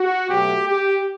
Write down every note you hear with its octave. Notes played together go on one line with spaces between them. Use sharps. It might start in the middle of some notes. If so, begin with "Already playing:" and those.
Already playing: F#4
B2 F#3 A3 G4
G4